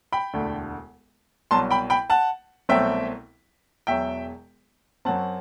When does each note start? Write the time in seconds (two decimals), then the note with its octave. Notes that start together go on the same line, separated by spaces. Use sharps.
0.13 G5 B5
0.33 E1 D2 D3 A3
1.51 C2 B2 F#3 A5 C6
1.71 G5 B5
1.90 G5 B5
2.10 F#5 A5
2.69 C2 B2 F#3 A3 C4 E5 G5
3.87 E1 E2 B2 F#3 E5 G5
5.05 F#2 F#3 C4 F#5 A5